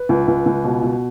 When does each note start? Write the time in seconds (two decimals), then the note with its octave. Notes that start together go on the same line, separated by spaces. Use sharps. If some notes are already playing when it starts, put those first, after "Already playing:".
Already playing: B4
0.09 C#2
0.28 C#2
0.46 C#2
0.64 B2
0.83 B2